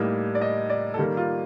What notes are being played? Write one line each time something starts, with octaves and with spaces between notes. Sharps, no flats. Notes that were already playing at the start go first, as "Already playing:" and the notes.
Already playing: A2 G3 A#3 D#4
D5
D#5
D5
A4
D#3 G3 A#3 G4
F4